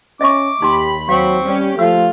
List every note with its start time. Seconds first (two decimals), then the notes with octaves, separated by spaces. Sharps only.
0.21 C#4 D#5 E5 C#6 D6
0.62 D#2 D#4 G4 B5 C6
1.09 F#3 C4 F5 C#6
1.45 G3 C#4 G4
1.79 F3 A3 F4 F5 E6